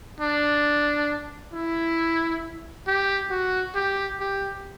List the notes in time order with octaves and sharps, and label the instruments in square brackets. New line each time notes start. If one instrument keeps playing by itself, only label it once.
[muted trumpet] D4
E4
G4
F#4
G4
G4